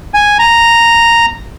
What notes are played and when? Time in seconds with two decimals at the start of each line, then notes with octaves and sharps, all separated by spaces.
0.14 G#5
0.39 A#5